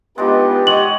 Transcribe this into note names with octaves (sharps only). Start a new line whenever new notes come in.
G#3 B3 D4 D#4 F4 G4
G#3 C#5 D#5 F#5 F#7